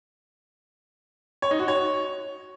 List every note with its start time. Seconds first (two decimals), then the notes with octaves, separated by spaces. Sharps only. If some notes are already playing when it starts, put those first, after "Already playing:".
1.42 C#5
1.51 D#4
1.59 F#4
1.68 C#5